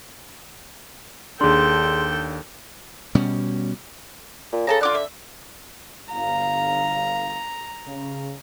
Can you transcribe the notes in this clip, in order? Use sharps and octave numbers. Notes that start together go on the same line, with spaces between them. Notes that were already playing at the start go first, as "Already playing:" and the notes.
D#2 D4 G#4 A4 G5 C6
B2 G3 C#4
A#2
C#3 A4 A5 A#5
D3 F4 D6 F#6
E5
G1 F5 A#5
C#3